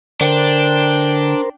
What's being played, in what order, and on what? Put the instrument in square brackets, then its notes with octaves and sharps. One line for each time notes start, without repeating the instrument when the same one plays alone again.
[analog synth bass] D3 [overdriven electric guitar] D4 [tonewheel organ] A#4 C5 [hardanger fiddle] G5